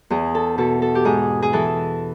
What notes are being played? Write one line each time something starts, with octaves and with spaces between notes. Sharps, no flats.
E2 G#4
A4
B2 A4
A4
G4
G#2 G#4
G#4
E3 A4